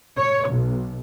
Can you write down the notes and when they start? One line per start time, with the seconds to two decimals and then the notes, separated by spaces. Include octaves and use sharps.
0.18 C#5
0.48 B1